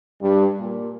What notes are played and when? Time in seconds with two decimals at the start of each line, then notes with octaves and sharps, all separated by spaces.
0.21 G2
0.60 A#2